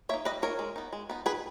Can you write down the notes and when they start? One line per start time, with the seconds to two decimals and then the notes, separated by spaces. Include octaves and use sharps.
0.09 A#3 C#5 E5
0.14 D#4
0.25 G3 B4 D#5
0.42 A#3 D#4 A#4 C#5
0.59 G#3
0.76 B3 D#4
0.93 G#3
1.10 B3 D#4
1.26 D#3 G#4 B4